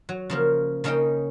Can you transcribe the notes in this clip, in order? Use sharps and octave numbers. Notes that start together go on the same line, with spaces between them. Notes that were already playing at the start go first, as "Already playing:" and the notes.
F#3
C#3 F3 A#3
C#3 A#3 C#4 D#4 D#5 G5